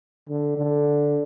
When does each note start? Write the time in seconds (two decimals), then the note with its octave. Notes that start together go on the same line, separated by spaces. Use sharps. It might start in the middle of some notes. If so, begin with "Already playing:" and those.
0.29 D3
0.57 D3